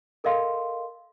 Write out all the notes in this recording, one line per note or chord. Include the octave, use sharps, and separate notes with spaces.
A4 A#4 D#5 F5 C6